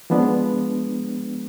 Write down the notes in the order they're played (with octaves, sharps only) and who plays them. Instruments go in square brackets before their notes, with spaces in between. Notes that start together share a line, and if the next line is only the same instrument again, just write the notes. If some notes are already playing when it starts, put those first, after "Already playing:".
[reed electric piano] F3 G#3 B3 D4